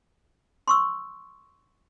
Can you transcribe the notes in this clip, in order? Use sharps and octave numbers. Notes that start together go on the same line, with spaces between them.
C6 C#6 E6